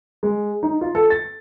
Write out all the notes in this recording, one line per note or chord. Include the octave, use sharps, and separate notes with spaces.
G#3
D#4
F4
A4
A6